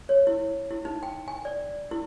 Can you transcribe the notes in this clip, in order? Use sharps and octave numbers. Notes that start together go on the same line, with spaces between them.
C#5
E4
E4
D#4
G5
G#5
D5
E4